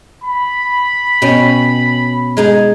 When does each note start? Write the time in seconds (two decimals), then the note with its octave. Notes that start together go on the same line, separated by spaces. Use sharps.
0.24 B5
1.22 B2 C#4 G5
2.37 G#3 D#4 G#4